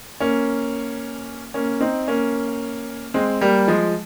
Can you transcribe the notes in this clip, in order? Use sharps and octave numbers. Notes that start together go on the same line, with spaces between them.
A#3 C#4
A#3 C#4
C4 D#4
A#3 C#4
G#3 C4
G3 A#3
F3 G#3